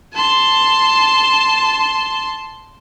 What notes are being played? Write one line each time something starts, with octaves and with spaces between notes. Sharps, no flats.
A5 C6